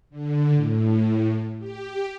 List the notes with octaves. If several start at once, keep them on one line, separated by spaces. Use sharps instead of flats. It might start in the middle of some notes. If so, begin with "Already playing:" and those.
D3
A2
G4